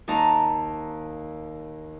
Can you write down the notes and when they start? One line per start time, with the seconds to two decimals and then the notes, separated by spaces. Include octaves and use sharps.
0.08 D#2 D#4 A5 A#5